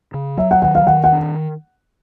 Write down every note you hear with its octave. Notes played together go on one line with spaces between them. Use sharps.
C#3
F#3 E5
F#5
D#3 F#5
F5
D#3 F#5
F#5
D4